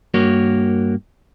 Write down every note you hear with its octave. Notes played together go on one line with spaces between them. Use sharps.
G2 A#3 F#4 A#4 C#5